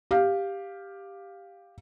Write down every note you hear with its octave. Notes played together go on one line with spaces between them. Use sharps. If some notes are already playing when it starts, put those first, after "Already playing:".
G4 F5